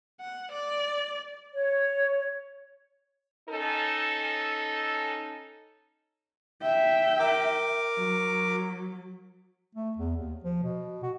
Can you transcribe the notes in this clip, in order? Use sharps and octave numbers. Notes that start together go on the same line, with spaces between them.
F#5
D5
C#5
C#4 D#4 A4
E5 G5
A#4 D6
F#3
A3
E2
D#2
F3
B2
F#4